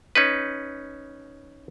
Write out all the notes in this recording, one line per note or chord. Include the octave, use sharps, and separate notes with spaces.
C#4 D#4 B4